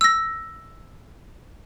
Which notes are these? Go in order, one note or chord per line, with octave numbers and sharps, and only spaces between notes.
E6 A#6